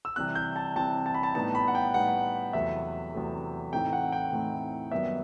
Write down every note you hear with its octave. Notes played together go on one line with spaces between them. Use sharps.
E6
C3 E3 G3 C4 F#6
G6
A5
C3 E3 G3 C4 A5
A5
B5
A5
A2 G3 B3 D#4 A5
B5
F#5
G5
A2 G3 B3 D#4 F#5
E2 C3 F#3 A3 E5
E2 C3 F#3 A3
A2 E3 A3 C4 D#4 G5
F#5
G5
A2 E3 A3 C4 D#4
F#2 D#3 G3 B3 E5